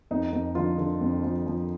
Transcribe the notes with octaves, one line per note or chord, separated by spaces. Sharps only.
F2 D#4
F2
D3 F3 F4
D3
F2
F3
F3